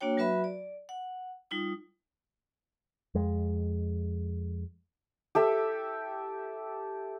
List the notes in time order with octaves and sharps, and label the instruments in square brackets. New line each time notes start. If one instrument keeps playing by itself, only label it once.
[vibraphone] A#3 D4 F#4 C#5 G5
F#3 F#4 B4 E5 B5
D5
F#5
G3 D#4 F4 D#6
[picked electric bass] F2 G#3
[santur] G4 A4 E5